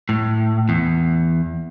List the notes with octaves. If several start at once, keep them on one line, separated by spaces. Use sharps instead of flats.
A2
E2